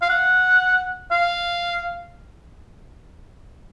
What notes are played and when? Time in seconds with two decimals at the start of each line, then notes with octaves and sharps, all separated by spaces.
0.02 F5
0.09 F#5
1.11 F5